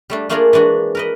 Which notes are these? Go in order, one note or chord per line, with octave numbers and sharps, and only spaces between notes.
G3 A3 D4
A3 A#3 D4 F4 G#4 A#4
E3 G#3 D4 F#4
A#4 B4 D#5